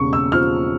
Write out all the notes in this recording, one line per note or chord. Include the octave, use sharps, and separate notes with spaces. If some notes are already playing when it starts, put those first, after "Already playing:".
Already playing: E1 C#3 C#6
E6
F3 F6